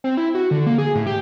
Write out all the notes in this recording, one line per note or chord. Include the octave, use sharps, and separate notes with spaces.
C4
E4
F#4
D3
A#3
G#4
A2
G4